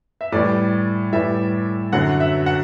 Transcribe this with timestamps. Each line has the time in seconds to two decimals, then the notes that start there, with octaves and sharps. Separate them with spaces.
0.21 E5
0.32 A2 E3 G3 D5
1.12 A2 E3 G3 E5
1.93 F#2 D3 F#3 F#5
2.20 E5
2.46 F#5